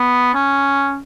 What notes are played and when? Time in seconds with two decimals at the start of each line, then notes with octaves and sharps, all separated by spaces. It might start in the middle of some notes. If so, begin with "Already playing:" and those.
Already playing: B3
0.34 C#4